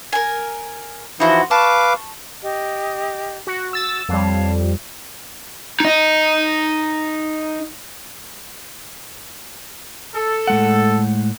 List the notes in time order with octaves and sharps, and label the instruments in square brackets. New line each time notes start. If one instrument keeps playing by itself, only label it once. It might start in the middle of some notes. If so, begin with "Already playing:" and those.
[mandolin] A#4 G#5
[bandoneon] E3 F3 E4 [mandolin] D#4 F#4 C5
[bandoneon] B4 F5 D6 [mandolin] A5 C#6
[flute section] G4 D#5
[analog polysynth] F#4
[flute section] F#4 [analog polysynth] E6 A6
[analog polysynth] F2 G3 [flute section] C#5 F5 A5
[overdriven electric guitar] D#4 D#5
[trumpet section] A4
[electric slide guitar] A2 G#3 F#5